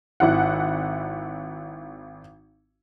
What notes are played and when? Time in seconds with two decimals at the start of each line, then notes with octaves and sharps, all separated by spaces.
0.20 G#1 E4 F#5